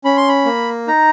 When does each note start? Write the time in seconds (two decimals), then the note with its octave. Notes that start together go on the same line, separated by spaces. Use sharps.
0.04 C#4 B5
0.17 C6
0.28 B5
0.45 A#3
0.87 D#4 A#5